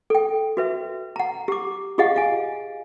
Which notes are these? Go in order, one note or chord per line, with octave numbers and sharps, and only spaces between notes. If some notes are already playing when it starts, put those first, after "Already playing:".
A4 G5
F#4 B4 E5
F#5 A#5
G4 D6
F4 G4 G#4 D#5 F5 F#5
F5 G#5